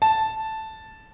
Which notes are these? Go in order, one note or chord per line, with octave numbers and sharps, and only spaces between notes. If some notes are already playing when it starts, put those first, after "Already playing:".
A5